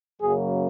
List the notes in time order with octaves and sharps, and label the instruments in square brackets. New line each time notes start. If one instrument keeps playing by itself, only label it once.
[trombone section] F#2 C#3 F#3 A#3 G#4